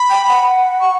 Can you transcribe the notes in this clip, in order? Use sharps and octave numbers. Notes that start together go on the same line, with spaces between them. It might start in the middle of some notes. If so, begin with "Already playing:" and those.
Already playing: B5
G5
F#5
C#6